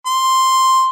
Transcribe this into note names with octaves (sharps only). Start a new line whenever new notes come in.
C6